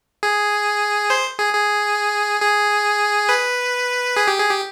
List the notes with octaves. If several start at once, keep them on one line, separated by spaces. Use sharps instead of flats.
G#4
C5
G#4
G#4
G#4
B4
G#4
G4
G#4
G4